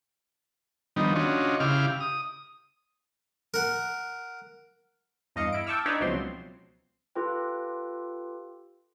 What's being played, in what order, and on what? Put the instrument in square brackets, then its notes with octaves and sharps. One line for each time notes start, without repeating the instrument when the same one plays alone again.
[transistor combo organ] D#3 F3 G3 B3 D4 D#4
C#4 D4 F4 F#4 C#5 D#5
C#3 E4 G4 F5 D6 F6
D#6
[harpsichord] A#4 F#5
[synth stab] E2 G2 D#5 F5 C#7
E4 D7
G5 A5 C#6 D6 E6 F6
D4 D#4 B4 C#5 D5 E5
C#2 B2 F3 F#3 C4 C6
[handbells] F4 G4 A4 B4 G5